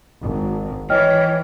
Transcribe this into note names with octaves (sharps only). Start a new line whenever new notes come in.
G#1
E3 C#5 D#5 G5 F6